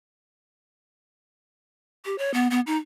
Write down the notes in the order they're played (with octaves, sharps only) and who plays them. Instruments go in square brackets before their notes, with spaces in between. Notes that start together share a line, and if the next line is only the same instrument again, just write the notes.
[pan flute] G4
C#5
B3
B3
D#4